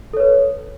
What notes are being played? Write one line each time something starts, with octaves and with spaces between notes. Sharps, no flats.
A4 B4 C#5